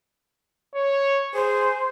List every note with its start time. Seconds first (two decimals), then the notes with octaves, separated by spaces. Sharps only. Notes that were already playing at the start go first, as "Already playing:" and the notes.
0.75 C#5
1.34 G#4 C5